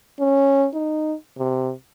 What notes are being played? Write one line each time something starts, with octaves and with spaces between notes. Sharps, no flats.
C#4
D#4
C3